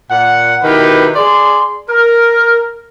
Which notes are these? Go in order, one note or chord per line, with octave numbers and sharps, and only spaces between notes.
A#2 F#5
B2 D#3 E4 G4 B4
G#4 D5 C6
A#4